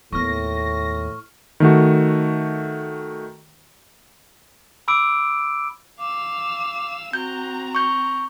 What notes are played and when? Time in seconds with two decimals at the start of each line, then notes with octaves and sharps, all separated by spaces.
0.13 D#2 A2 B3 C#6 F6 A#6
1.60 D#3 A3 F#4
4.88 B5 D6 E6 D7
5.99 F5 D6 E6
7.13 C4 F#4 A#5 G6
7.75 C#6 G6